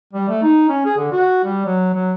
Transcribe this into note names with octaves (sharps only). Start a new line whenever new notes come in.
G3
A3
D#4
C#4
G#4
D3
F#4
G3
F#3
F#3